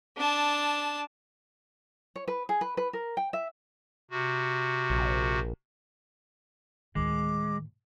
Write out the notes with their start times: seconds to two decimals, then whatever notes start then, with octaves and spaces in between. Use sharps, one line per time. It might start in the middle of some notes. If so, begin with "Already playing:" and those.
0.17 D4 A5
2.16 C#5
2.28 B4
2.49 G#4
2.61 B4
2.77 B4
2.93 A#4
3.17 G5
3.33 E5
4.11 C3 F#4
4.90 A#1
6.95 D2 A2 D#3 G#3 D6